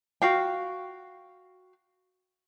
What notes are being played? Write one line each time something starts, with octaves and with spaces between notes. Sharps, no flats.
F#4 F5 G5